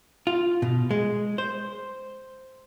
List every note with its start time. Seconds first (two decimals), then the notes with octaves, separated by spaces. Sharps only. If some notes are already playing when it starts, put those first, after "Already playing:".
0.27 F4
0.62 B2
0.91 G#3
1.38 C5